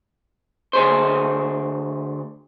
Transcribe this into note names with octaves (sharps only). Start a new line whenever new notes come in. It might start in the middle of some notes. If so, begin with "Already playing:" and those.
D2 G#4 C5